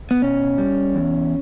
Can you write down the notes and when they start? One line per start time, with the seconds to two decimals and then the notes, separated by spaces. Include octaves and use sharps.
0.11 B3
0.22 B2 C#4
0.58 G3
0.95 E2